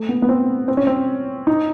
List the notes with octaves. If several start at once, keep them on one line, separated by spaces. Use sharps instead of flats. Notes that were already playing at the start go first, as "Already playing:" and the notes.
Already playing: A3
B3
B3
C4
C4
C#4
C4
D#4